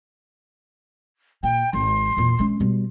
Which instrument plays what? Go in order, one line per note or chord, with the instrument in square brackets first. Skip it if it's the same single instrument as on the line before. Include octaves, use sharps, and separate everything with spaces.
[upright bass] A#2 [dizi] G5
[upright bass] G#1 [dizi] C6
[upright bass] E2 A#2
G#3 C#4
B2 G3